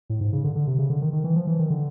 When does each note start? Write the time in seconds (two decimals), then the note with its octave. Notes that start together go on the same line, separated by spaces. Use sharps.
0.10 A2
0.21 G#2
0.33 C#3
0.44 D3
0.55 D3
0.67 C3
0.79 C#3
0.90 D3
1.01 D#3
1.13 D#3
1.24 E3
1.36 F3
1.47 E3
1.59 D#3
1.70 D3